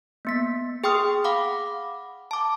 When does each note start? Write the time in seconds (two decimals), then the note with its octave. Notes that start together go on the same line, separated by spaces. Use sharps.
0.25 A#3 B3 B6
0.84 G#4 G5 C6 D#6 F6
1.24 F5 F#5 B5 D6
2.31 A5 D6